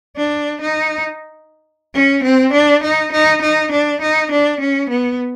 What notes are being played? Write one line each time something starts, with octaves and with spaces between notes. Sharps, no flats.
D4
D#4
C#4
C4
D4
D#4
D#4
D#4
D4
D#4
D4
C#4
B3